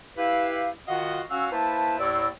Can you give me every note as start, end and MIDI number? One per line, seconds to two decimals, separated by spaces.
0.17 0.69 64
0.17 0.69 67
0.17 0.69 71
0.17 0.69 77
0.88 1.21 51
0.88 1.21 65
0.88 1.21 66
0.88 1.21 75
0.88 1.21 77
0.88 1.21 78
1.30 1.49 61
1.30 1.49 66
1.30 1.49 77
1.30 1.49 88
1.52 1.97 58
1.52 1.97 64
1.52 1.97 71
1.52 1.97 72
1.52 1.97 76
1.52 1.97 81
1.99 2.28 39
1.99 2.28 45
1.99 2.28 74
1.99 2.28 88